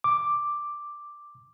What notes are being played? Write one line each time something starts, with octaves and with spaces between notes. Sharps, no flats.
D6